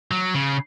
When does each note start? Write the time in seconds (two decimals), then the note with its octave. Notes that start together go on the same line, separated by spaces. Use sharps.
0.11 F#3
0.35 C#3